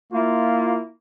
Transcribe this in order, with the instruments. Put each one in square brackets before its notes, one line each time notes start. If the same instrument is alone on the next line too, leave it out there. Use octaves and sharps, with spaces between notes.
[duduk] A#3 [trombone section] E4 F4